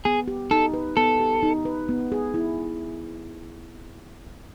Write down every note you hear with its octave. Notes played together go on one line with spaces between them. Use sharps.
B3 G#4
G4
D#4 A4
B4
B3 A4
G4
D#4
B4
B3
G#4
E4